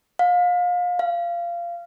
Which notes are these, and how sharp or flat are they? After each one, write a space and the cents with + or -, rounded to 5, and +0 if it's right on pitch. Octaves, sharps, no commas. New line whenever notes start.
F5 +30
F5 -20